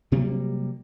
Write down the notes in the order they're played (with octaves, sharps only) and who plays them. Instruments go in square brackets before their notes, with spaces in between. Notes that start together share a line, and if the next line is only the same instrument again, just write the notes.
[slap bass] C3 F#3 G3 A#3